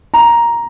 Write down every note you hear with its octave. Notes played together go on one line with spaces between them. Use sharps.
A#5